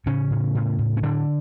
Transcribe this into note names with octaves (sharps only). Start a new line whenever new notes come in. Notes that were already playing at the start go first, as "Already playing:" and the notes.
A2 C#3 C#4
A2
A2
A2
C#4
A2 D3 D4